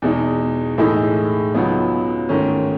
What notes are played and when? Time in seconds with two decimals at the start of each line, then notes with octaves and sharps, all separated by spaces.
0.02 E2 B2 G#3 D#4
0.78 A2 E3 G#3 D#4 A4
1.54 C#2 C#3 F#3 B3 D#4
2.29 G#2 D#3 A3 C#4